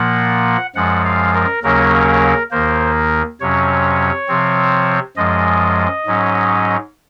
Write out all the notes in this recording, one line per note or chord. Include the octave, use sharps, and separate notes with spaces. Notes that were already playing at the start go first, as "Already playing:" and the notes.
Already playing: A#2 F3 A#3 F#5
F#2 F3 G#3 F#5
F5
A#4
D#2 C#3 F#3 A#3 C#4 A#4
D#2 D#3 A#3 C5
F2 C3 F#3 C#4 C#5
C3 F3 C4
F#2 F3 G#3 D#5
G#2 F#3 C#4